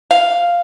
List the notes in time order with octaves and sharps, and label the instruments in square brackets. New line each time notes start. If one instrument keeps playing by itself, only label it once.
[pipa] F5